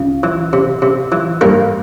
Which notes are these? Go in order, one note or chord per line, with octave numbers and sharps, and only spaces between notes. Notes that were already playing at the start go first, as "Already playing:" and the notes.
Already playing: C#2
E3
C3
C3
E3
G2 A#3 A#4